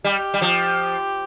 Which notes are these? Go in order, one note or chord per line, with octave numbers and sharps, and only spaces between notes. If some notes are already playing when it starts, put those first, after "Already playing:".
G3 G4
G3
F3